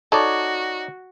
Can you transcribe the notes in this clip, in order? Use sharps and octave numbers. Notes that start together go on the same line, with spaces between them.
D#4 F#4 A4 C#5 D5